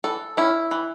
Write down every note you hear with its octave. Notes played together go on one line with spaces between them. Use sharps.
E3 A4
C#4 E4
E3